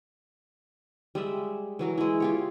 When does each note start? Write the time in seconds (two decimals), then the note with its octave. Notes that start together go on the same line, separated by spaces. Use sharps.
1.15 G3 G#3 E5
1.79 E3 F#3 A#4
1.98 G#3 E4
2.20 F4 G4 C#5